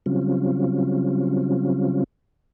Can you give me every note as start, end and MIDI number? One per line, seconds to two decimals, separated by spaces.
0.06 2.04 49
0.06 2.04 54
0.06 2.04 55
0.06 2.04 60
0.06 2.04 61
0.06 2.04 65